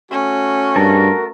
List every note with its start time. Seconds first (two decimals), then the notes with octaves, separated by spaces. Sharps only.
0.11 A3 C#4 F#4
0.76 G2 A#4 A5